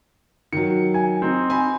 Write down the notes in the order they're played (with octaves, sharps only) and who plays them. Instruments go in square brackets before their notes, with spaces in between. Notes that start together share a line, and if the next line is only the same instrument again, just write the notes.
[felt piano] D#3 F#3 [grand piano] C#7
[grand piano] G#5
C4 D#4
[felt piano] G#5 B5